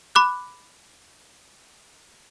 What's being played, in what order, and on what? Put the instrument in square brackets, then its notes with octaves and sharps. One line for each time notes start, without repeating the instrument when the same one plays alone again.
[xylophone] B5 D6 F#6